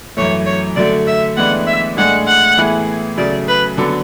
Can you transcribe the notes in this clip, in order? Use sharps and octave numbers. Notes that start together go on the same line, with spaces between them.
F#2 E3 A3 C#5
C#5
D3 F#3 A3 D5
E5
A2 E3 G#3 B3 D4 F#5
E5
A2 G#3 D4 G#4 F#5
F#5
A2 E3 B3 E4 G#4
C#3 F#3 A3 D5
B4
D3 F#3 B3 D4 A4